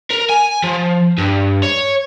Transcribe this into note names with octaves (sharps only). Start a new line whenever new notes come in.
A#4
G#5
F3
G2
C#5